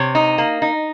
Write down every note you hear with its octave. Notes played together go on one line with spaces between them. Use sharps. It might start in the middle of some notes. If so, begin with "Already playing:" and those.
Already playing: C3 C#5
D#4
A#3
D#4